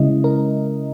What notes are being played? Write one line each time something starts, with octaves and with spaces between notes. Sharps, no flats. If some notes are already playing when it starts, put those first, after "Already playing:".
Already playing: C#3 G#3 C#4 E4 D#5
A#4